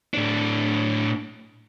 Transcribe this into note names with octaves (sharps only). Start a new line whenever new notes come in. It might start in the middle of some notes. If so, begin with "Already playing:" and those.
A2 D4